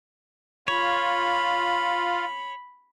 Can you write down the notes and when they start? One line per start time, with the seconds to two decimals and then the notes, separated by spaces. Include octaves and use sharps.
0.68 F4 C#5 B5